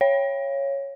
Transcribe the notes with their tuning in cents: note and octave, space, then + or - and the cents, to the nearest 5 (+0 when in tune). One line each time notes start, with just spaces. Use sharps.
C#5 -5 F5 -25